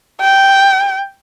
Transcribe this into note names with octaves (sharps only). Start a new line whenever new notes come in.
G5